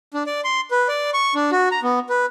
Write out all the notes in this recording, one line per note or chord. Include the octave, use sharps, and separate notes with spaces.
D4
D5
C6
B4
D5
C#6
D4
F#4
A#5
B3
B4